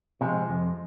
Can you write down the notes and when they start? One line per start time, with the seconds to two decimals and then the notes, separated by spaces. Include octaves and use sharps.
0.21 C3 F3 G#3
0.48 F2